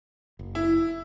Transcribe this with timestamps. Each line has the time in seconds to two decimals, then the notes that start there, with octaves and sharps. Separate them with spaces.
0.39 F#1
0.55 E4